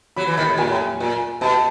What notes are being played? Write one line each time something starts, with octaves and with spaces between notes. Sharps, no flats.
F#3 B5
E3
D#3 B5
A2
A#2 G#5
A2
A#2
B2 A5